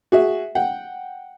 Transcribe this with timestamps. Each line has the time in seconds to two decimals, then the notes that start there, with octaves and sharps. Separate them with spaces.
0.12 F#4 G#4 E5
0.55 F#5 G5